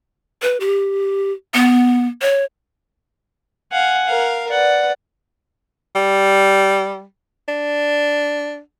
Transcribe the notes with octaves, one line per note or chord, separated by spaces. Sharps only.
B4
G4
B3
C#5
F5 F#5 G#5
A#4 F5
B4 D5 F#5
G3
D4